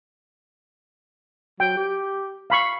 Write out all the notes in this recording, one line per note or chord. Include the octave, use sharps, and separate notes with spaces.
F#3 G5
G4
F5 B5 C#6